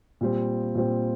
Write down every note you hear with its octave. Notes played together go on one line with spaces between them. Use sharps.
A#2 G3 C4
A#2 G3 C4